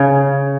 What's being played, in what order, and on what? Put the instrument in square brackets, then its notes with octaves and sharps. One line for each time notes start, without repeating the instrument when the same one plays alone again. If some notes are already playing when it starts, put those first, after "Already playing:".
Already playing: [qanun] C#3